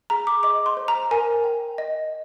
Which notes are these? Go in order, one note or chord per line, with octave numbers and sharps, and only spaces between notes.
G#4 A#5
D6
D#5 D6
C6
C5
A#5
A#4 G#5
G5
D#5